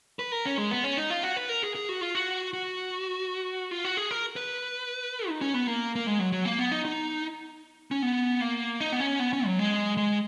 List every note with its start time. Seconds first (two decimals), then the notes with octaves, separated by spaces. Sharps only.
0.19 B4
0.32 A#4
0.46 C#4
0.58 G#3
0.71 B3
0.84 C#4
0.97 D#4
1.10 F4
1.23 F#4
1.37 B4
1.49 A#4
1.63 G#4
1.75 G#4
1.89 F#4
2.01 F4
2.15 F#4
2.53 F#4
3.71 F4
3.85 F#4
3.97 G#4
4.11 A#4
4.36 B4
5.28 D#4
5.41 C#4
5.54 B3
5.67 A#3
5.95 A#3
6.07 G#3
6.19 F#3
6.32 F#3
6.45 A#3
6.59 B3
6.72 D#4
6.85 D#4
7.91 C#4
8.02 B3
8.41 A#3
8.80 D#4
8.92 B3
9.00 C#4
9.19 B3
9.33 C#4
9.45 F#3
9.59 G#3
9.97 G#3